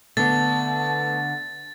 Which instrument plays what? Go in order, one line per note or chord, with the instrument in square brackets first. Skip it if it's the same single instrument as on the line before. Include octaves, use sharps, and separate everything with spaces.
[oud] D3 [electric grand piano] A3 B3 [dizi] A5 [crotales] A6